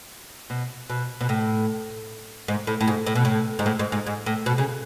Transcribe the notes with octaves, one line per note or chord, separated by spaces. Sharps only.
B2
B2
B2
A2
G#2
A2
A2
G#2
A2
B2
A2
G#2
A2
G#2
G#2
G#2
A2
B2
C#3